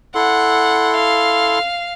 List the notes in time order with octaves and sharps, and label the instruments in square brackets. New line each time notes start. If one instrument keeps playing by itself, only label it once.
[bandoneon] E4 A4 C6 [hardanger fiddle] F#5
[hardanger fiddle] F5